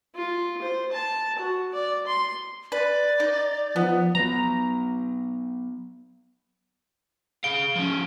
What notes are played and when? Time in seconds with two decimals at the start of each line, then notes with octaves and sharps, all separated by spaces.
0.15 F4
0.62 C5
0.92 A5
1.39 F#4
1.73 D5
2.07 C6
2.72 B4 D5
3.20 D#4
3.76 F3 B3
4.15 F#3 B3 A#5
7.44 G#4 F5 D7 G7
7.76 F3 C#4